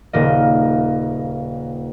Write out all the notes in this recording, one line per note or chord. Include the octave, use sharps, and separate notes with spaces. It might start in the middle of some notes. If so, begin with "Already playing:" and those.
D#1 C#3 A#3 D#5